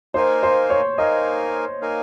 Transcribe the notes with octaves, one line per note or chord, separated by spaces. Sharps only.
A#3 D#4 A#4 C5 F5 G#5
C5
C#5
A#3 D#4 A#4 D#5 F5 G#5
A#3 D#4 A#4 F5 G#5